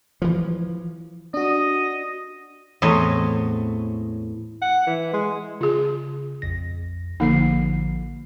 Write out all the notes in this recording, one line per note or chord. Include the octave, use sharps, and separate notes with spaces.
E3 F3
D4 F#4 D#5
E2 A2 C4 C#5 D#5
F#5
E3
G#3
C#3 F4 G#4
A#1 F2 A#6
A1 D3 F3 A#3 D#4 C7